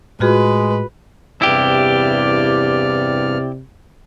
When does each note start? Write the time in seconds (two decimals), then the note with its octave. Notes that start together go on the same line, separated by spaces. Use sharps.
0.20 A2 G#3 F4 F#4 G#4 B4
1.42 E2 G2 C3 E4 G4 D5 F6